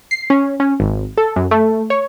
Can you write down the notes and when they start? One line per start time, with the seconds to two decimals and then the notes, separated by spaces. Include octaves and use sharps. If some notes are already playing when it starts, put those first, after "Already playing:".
0.11 C7
0.30 C#4
0.60 C#4
0.80 G#1
1.17 A4
1.36 F#2
1.51 A3
1.90 C#5